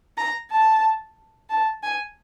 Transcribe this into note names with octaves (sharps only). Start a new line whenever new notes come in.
A#5
A5
A5
G#5